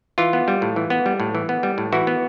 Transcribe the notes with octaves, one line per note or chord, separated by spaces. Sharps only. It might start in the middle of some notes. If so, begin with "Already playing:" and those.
E3 F4
B3
G3
A2
E3
B3
G3
A2
E3
B3
G3
A2
E3 E4 F#4
B3